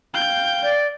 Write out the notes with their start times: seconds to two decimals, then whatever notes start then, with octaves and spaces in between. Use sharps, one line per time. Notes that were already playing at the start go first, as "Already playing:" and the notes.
0.14 F5 G5 G6
0.63 D5